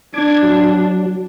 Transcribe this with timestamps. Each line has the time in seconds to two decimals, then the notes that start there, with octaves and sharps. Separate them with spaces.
0.14 D4 D6 G#6
0.43 F#3